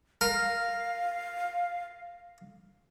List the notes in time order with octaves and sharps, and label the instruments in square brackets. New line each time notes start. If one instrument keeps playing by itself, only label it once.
[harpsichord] A#4 [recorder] F5